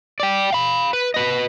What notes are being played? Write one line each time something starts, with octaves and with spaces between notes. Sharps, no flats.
D5 G5
F5 B5
B4
B4 D#5